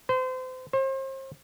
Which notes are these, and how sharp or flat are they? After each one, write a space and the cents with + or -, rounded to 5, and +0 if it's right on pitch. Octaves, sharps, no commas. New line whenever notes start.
C5 -35
C5 +35